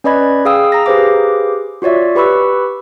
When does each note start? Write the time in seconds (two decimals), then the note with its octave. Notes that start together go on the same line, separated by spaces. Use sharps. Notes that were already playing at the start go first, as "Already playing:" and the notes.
0.04 C#4 B4 D5 D#5 B5 G#6
0.45 G#4 F5 G5 D#6 E6
0.72 A#5 A#6
0.86 G4 G#4 B4 C5 F5 D6
1.82 F4 F#4 C#5 D5 E5
2.15 G4 B4 B5 C#6 E6